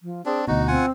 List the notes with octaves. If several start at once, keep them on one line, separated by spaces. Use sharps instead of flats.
F3
C4 D4 G#4
D2 B2 D#4 F#4 D#5
C4 F4 F#5 G#5